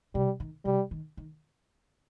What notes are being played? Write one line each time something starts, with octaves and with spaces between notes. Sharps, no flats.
C3 G3
D#3
C3 G3
D#3
D#3